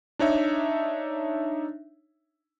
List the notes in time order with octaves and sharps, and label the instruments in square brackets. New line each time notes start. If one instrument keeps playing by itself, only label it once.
[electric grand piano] D4 D#4 C#5 E5